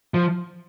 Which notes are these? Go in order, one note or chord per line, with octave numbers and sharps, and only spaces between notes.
F3